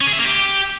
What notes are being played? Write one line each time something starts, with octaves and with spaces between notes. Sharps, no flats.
C#4
G#4
E5
A#3
G4